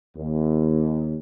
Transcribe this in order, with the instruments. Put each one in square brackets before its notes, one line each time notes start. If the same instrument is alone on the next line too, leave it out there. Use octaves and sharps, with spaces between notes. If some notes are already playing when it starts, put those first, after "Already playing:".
[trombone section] D#2